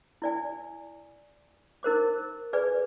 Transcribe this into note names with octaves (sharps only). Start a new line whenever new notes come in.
E4 D5 G#5
D#4 A#4 C5 D6
G#4 B4 D5 G#5